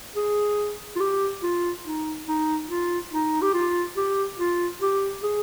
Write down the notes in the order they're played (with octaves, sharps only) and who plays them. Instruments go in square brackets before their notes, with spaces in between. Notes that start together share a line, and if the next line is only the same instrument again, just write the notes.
[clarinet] G#4
F4
G4
F4
D#4
D#4
F4
D#4
G4
F4
G4
F4
G4
G#4